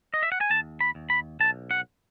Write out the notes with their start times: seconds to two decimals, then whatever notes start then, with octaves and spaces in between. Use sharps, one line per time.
0.14 D#5
0.23 E5
0.32 F#5
0.41 G#5
0.50 D#2 A5
0.80 B5
0.95 D#2
1.10 B5
1.40 B1 A5
1.71 F#5